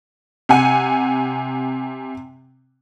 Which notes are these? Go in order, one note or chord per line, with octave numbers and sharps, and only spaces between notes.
C3 F#5 G#5 C#7